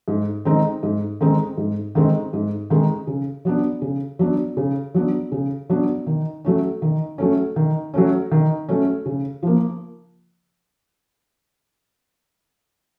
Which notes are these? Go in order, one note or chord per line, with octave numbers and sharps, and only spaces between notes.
G#2
D#3 G#3 C4 D#4
G#2
D#3 G#3 C4 D#4
G#2
D#3 G#3 C4 D#4
G#2
D#3 G#3 C4 D#4
C#3
F#3 B3 D4
C#3
F#3 B3 D4
C#3
F#3 B3 D4
C#3
F#3 B3 D4
D#3
F#3 A3 C#4
D#3
F#3 A3 C#4
D#3
F#3 A3 C#4
D#3
F#3 A3 C#4
C#3
F3 A#3